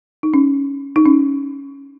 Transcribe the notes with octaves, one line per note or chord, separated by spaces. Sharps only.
D#4
C#4
D#4
C#4